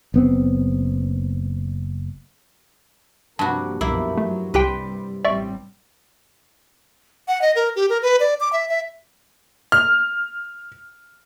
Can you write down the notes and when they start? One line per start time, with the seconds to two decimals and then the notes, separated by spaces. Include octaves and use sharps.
0.14 F#1 B3 C4
3.39 G2 C3 F3 A#3 F#4 A5
3.81 C2 F#2 B2 F3 A#3 E4
4.18 F3 F#3 A3
4.54 C2 C3 G3 G4 B4 C5 G5
5.25 A1 G3 C4 D5 E5 C#6
7.28 F#5
7.42 D#5
7.56 A#4
7.76 G4
7.89 A#4
8.02 B4
8.20 D5
8.40 D6
8.53 E5
8.69 E5
9.72 F6